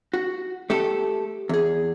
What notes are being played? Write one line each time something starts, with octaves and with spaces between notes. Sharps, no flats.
F#4
A3 G4 A4
E2 G#4